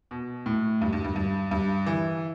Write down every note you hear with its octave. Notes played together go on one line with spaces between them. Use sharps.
B2
A2
G2
G2
G2
G2
G2
E3